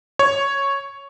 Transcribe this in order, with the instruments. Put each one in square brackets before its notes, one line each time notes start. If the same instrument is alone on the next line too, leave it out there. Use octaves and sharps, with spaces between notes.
[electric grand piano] C#5